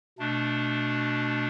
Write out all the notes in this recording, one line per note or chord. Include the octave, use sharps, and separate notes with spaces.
B2 A3 D4